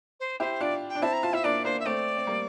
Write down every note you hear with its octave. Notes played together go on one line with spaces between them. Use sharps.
C5
E4 G4 C5
D4 F4 D5
G5
D4
C4 E4 A5
A#5
F4 A5
E4 E5
A#3 D4 D5
A#3 D4 C5
E5
A3 C4 D5
C4
G3 A#3